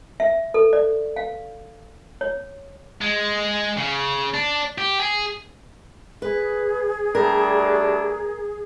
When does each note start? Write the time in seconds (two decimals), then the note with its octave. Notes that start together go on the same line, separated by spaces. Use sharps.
0.20 E5
0.54 A4
0.73 D5
1.16 F5
2.21 C#5
3.01 G#3
3.77 C#3
4.34 D4
4.78 G4
5.00 G#4
6.22 G#4 B4
7.15 G3 A3 D4 A#4